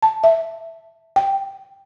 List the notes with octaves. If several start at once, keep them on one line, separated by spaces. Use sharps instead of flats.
A5
E5
G5